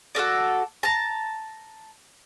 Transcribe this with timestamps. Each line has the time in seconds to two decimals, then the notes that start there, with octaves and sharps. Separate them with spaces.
0.15 F#4 A4 A#4 D5
0.83 A5 A#5